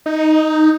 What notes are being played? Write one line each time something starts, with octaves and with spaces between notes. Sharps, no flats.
D#4